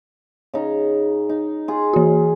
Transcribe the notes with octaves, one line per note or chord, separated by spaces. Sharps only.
C#3 D#4
D#4
F4 G#4
E3 F#4